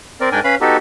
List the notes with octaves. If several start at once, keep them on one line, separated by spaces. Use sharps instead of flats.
C4 A#4 D5
G#2 D4 A#4 D5 G5 G#5
C#4 B4 F5 B5
B3 D#4 F#4 G4 A4